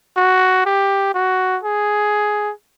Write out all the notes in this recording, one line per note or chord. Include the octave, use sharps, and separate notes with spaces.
F#4
G4
F#4
G#4